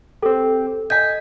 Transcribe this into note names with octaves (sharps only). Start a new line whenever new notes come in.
C4 G4 A4
D#5 G#5 G6 G#6 B6